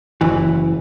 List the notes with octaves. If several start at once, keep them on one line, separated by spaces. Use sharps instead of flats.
F#1 E3